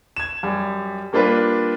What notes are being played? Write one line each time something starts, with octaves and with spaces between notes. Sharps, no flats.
G#6 E7
F#2 G3
G3 A#3 D4 F4 B4